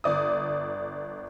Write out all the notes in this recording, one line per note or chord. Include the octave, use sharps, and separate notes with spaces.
G1 D5 D#6